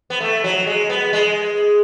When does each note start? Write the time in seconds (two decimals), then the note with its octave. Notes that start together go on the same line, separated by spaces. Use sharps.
0.10 B3
0.20 A3
0.44 F#3
0.67 G#3
0.90 B3
1.13 G#3